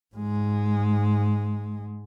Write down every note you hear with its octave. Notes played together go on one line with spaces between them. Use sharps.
G#2 G#3